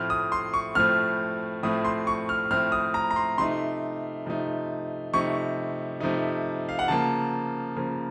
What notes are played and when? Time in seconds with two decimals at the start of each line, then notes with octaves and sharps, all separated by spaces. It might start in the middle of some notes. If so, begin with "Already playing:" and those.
Already playing: A2 F3 A3 C4 F6
0.10 D#6
0.32 C6
0.54 C#6
0.75 A2 F3 A3 C4 F6
1.63 A2 F3 A3 C4 D#6
1.85 C6
2.07 C#6
2.29 F6
2.51 A2 F3 A3 C4 F6
2.72 D#6
2.94 A#5
3.11 A#5
3.16 C6
3.38 C3 F3 A3 D#4 C6
4.26 C3 F3 A3 D#4
5.13 C3 F3 A3 D#4 C#6
6.00 C3 F3 A3 D#4
6.69 F5
6.79 F#5
6.88 C#3 F3 A#3 A5
7.76 C#3 F3 A#3